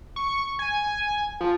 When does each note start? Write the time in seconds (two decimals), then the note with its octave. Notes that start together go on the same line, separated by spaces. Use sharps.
0.16 C#6
0.59 G#5
1.41 F3